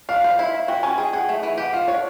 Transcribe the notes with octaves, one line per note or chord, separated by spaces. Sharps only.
D4 F5
C5 F5
E4
E4
F#4 G5
C#4 G#5
G#4 G5
G#4 F#5
A3
E3
G4 F#5
F3 F5
D4 C#5